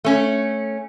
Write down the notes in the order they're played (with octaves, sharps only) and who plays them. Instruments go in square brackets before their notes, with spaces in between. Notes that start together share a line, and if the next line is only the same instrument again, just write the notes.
[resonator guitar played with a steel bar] A3 C#4